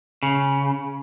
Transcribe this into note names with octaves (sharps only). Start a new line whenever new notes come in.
C#3